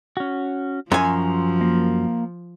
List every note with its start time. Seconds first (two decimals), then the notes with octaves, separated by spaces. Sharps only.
0.17 C#4 F#4
0.92 F#2 F3 G#5 A#5 C6 C#6
1.61 A#3